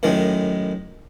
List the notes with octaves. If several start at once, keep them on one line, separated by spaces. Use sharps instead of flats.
F#2 A2 D#3 G#3